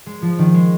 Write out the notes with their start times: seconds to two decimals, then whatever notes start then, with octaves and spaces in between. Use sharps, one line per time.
0.06 G#3
0.22 F3
0.39 D#3
0.54 G#3